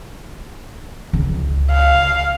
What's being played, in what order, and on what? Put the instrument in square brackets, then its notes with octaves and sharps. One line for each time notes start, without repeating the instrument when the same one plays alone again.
[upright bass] C#2
[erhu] F5